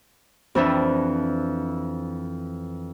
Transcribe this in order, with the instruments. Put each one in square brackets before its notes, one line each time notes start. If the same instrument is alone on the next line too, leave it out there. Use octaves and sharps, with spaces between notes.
[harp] F2 E3 D4 E5